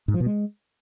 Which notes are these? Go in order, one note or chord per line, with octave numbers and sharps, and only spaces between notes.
G#2
F3
B2
G#3